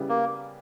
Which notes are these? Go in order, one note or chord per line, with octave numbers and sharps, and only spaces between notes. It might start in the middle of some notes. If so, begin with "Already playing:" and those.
Already playing: C#3 G3 B3 E4 G4
A#3